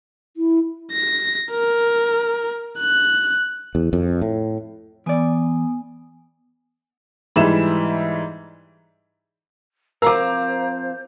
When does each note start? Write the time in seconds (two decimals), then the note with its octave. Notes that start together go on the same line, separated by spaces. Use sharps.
0.37 E4
0.93 A#6
1.51 A#4
2.79 F#6
3.75 E2
3.93 F2
4.22 A2
5.06 E3 B3 D5 G#5 D#6
7.36 G#2 E3 G3 E5 E7
10.02 F3 C4 A#4 C5 F5 F#5 A#5 D6